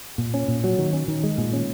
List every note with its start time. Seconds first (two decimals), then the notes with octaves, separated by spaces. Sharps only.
0.18 A#2
0.34 C#4
0.48 A#2
0.64 F#3
0.78 D#3
0.93 C#4
1.08 D#3
1.23 G#3
1.38 A#2
1.53 C#4